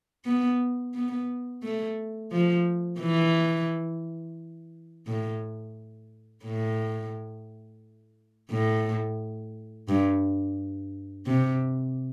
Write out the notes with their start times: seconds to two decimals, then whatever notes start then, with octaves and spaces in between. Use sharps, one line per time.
0.25 B3
0.94 B3
1.63 A3
2.32 F3
3.00 E3
5.07 A2
6.44 A2
8.50 A2
9.89 G2
11.26 C3